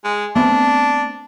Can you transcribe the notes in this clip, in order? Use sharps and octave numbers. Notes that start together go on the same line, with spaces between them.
G#3
A3 B3 C4 D4